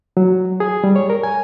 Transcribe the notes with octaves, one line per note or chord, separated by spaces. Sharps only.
F#3
G#4
G3
C#5
A#4
G#5